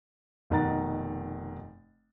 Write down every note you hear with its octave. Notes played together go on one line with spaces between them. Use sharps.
F1 B2 D#3 F#5 A#5 A6